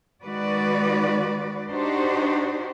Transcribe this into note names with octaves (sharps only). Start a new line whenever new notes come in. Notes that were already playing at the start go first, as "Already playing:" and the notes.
D#3 G#3 F#4 B4 D5
D4 D#4 F#4 G4 C5